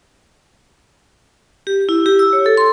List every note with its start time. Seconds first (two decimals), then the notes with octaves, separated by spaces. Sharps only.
1.67 G4
1.89 E4
2.06 G4
2.19 E6
2.33 C#5
2.46 A4
2.57 C6